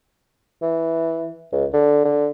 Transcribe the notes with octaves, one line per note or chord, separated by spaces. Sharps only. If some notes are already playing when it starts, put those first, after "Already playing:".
E3
C#2
D3
D3